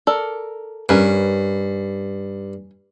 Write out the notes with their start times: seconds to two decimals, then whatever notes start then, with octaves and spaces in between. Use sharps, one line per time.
0.07 A4 A#4 D5
0.89 G2 C#4 A#4 B4